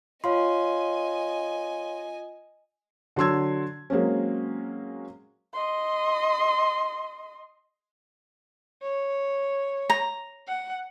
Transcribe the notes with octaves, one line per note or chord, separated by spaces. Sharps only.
F4 C#5 D#5 F5 G#5 C6
D3 F#3 C6 E6 G#6
F#3 G#3 A#3 C4 C#4
D#5 C6
C#5
A#5
F#5